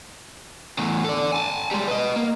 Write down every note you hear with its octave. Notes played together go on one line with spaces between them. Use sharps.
E2 A2
A4 D5
G#5 A5
G3 G#3
B4 D#5
A#3